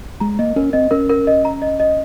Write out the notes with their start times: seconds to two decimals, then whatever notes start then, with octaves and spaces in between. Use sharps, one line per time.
0.20 G#3 A#5
0.39 A#3 D#5
0.56 C#4 A#4
0.73 C4 D#5
0.91 C#4 A#4
1.10 A#4
1.27 D#5
1.45 A#5
1.62 D#5
1.80 D#5